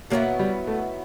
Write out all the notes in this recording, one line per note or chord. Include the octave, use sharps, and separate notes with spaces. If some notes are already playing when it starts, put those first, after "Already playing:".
B2 F#3 A#3 B3 E4
G3
A3